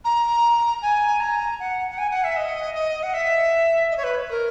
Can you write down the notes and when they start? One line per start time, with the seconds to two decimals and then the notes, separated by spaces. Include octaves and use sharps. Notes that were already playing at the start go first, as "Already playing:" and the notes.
0.05 A#5
0.82 G#5
1.20 A#5
1.60 F#5
1.91 F#5
1.98 G#5
2.11 F#5
2.24 E5
2.37 D#5
2.75 D#5
3.03 F#5
3.14 E5
3.91 D#5
3.97 C#5
4.04 B4
4.30 A#4